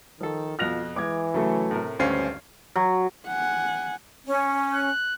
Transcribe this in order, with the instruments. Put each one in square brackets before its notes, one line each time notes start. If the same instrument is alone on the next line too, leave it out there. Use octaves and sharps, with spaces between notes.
[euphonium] D#3 [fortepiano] F3 A4
[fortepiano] F2 B2 F#6 [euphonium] F4 [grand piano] F6 A#6 F7
[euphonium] E3 [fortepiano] G#3 [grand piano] D6 G#6
[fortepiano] C#3 [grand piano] F#3 A3 A4
[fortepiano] A2 C3 A#4
[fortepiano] G#1 C#5 F5 [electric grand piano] D2 C#4 C7 [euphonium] G2 [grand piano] C5
[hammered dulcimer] F#3
[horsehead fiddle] F#5 G#5
[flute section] C#4
[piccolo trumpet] F#6